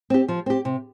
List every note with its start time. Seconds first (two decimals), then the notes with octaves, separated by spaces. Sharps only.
0.10 C4 G4
0.28 F3
0.46 C4 G4
0.65 C3